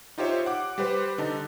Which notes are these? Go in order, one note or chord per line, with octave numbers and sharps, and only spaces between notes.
D#4 F4 G4 C5 C#5 E5
F#5 D6
G3 G4 B4 C5
D3 D#4 A5